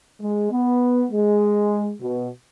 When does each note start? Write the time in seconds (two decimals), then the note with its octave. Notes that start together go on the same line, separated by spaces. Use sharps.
0.21 G#3
0.51 B3
1.11 G#3
2.01 B2